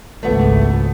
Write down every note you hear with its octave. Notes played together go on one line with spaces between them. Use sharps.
G#1 C#2 A3 B3